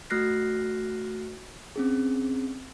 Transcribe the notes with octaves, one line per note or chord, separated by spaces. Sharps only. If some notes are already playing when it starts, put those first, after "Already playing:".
A3 F#4 F6 F#6 A#6 C7
C4 C#4 G#4